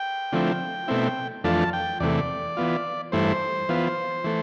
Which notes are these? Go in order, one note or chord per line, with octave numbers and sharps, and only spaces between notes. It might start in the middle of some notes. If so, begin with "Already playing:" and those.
Already playing: G5
D3 F3 A3 C4 E4
B2 A3 C4 E4
F2 E3 A3 D4 F4 A5
G5
E2 C3 E3 A3 D5
E3 B3 F4
G2 E3 A3 E4 C5
E3 B3 F4
E3 A3